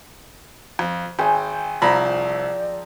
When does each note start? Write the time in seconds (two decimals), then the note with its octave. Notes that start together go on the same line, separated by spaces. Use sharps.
0.79 F2
1.19 G#1 G#4 G5 E6
1.82 C2 F3 D5 A#5 B5 E6